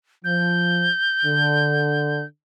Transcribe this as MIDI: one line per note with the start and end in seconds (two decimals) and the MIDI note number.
0.24 0.87 53
0.24 2.24 91
1.24 2.22 50